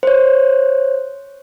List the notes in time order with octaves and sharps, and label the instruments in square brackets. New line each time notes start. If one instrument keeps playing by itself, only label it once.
[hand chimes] C5 C#5